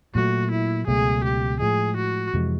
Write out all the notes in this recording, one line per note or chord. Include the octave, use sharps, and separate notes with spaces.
A#2 F#3 A3 F#4
E4
C#2 B2 F#3 A3 G#4
G4
A2 F3 G#3 G#4
F#4
F2 C3 E3 G#3